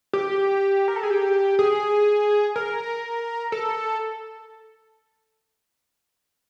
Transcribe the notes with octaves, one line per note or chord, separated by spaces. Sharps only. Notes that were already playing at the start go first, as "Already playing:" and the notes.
G4
A#4
A4
G#4
G4
G#4
A#4
A4